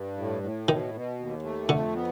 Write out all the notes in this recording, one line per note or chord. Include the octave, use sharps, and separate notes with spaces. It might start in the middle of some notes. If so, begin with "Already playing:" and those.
Already playing: G2
A2
A2
B2 D#3
B2
D#2
A3
F2 D3
B3